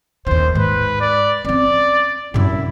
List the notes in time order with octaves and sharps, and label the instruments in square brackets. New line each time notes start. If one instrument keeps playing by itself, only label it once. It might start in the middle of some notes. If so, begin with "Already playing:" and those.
[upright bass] D#2 D#3 [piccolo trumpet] C5
[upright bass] G#2 [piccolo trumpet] B4
[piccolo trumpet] D5
[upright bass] C4 C#4 [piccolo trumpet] D5
[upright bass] F#2 C3 [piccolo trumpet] E4